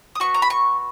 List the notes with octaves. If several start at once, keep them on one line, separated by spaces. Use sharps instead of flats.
D#6
B3 F#4 C#6
A#5
B5
C#6